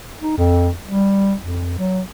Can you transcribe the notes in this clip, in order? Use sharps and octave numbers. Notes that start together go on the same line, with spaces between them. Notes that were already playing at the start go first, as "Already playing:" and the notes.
D#4
F2
G3
F2
F#3